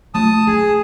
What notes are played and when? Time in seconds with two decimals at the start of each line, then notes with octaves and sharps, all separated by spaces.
0.14 A3 F4 A5 D#6
0.47 F4 G#4